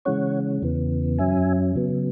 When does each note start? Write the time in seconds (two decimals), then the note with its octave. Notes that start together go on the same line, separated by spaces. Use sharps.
0.05 C#3 E3 G#3 C#4 C#5 F#5
0.62 E2 C#3 E3 B3
1.19 F#2 F#3 C#4 E5 G#5
1.75 C#3 F#3 B3